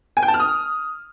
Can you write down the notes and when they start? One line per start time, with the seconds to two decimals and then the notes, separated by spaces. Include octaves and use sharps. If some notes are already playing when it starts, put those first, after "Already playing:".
0.17 G#5
0.22 G5
0.28 A5
0.34 F6
0.40 D#6